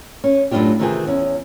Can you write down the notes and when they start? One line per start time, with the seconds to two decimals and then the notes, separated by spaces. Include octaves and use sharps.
0.24 C#4
0.51 F#2 A2 A#3 D4 F4 G4
0.79 C3 D#3 E3 C4 F4 G#4
1.07 E2 C#4